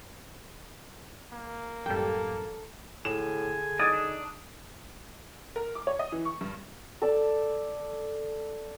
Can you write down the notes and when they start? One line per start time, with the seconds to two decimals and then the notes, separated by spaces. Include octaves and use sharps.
1.33 A#3
1.86 A1 F#2 G3 A4 G5
3.05 A2 D3 G#4 G#5 E7
3.80 F#3 D#4 D5 D#5 D#6
3.93 D4
5.56 A#4
5.75 D6
5.87 C#5
5.99 D#5
6.12 E3
6.25 C#6
6.41 G2
7.02 A4 D5 A5